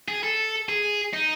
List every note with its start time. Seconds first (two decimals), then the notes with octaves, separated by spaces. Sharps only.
0.08 G#4
0.23 A4
0.69 G#4
1.14 D#4